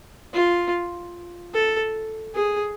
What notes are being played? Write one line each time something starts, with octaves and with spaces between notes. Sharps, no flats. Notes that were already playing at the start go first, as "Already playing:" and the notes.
F4
A4
G#4